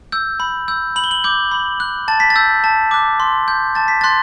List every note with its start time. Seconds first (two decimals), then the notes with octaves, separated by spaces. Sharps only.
0.12 E6 G6
0.40 B5
0.68 E6 G6
0.96 B5 F#7
1.04 G7
1.11 F#7
1.24 D6 G6
1.51 B5
1.80 F#6
2.08 A5 A6
2.20 B6
2.30 A6
2.36 E6 G6
2.64 A5
2.91 D6 F#6
3.20 C6
3.48 G6
3.75 A5 A6
3.88 B6
4.01 C6 F#6 A6